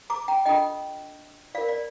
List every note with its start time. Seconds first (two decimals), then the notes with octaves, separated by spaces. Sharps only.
0.10 A#5 D6
0.28 G5 A#5
0.46 D4 F4 A4 D#5 G5
1.55 F4 D5 F5
1.58 A#4
1.69 D5